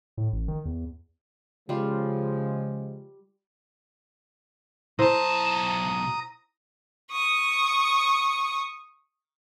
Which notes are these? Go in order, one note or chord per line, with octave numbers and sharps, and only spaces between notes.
A2
A1
D#3
E2
C#3 F3 G3 G#3 F4
B1 E4 C5 A5 A#5 D#6
C#6 D#6